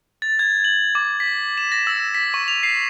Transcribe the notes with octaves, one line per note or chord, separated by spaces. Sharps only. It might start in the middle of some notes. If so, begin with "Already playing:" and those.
A6
G#6
F#7
D6
B6
E7
A#6
E6
B6
C#6
F7
C7